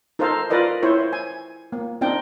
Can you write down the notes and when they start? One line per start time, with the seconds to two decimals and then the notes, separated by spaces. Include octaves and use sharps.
0.19 D#4 A4 A#4 C5 F5
0.50 F4 A#4 B4 D5 D#5
0.83 E4 C5 C#5
1.13 G#5
1.72 A#3
2.01 C4 D4 D#4 G5